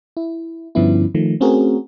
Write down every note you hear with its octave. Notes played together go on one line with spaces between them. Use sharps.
E4
G2 D3 F3 B3 C#4 E4
D#3 F3 A3
A3 C4 C#4 F#4 G#4 A#4